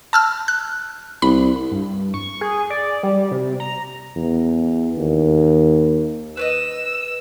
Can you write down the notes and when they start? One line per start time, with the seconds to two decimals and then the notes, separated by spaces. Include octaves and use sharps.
0.13 A5 E6 F6
0.48 F#6
1.22 C2 B5
1.72 G2
2.14 C#6
2.41 G#4
2.70 D5
3.03 G3
3.31 C3
3.60 A#5
4.16 E2
4.98 D#2
6.37 B4 D5 D#5 E6